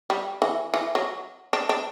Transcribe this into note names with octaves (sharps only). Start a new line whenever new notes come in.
G3
E3
E3
F#3
D4
D4